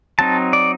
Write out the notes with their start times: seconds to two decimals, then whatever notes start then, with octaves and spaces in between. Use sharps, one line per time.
0.19 F#3 C4 D#4 A5
0.53 D5